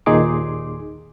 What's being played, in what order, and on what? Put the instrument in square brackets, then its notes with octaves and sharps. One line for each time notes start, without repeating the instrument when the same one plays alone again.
[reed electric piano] D#2 A#2 D#4 G#4 C6 D6